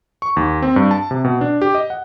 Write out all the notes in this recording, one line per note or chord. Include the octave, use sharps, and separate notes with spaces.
C#6
D#2
C4
G2
A5
C3
B2
D4
G4
D#5
F#5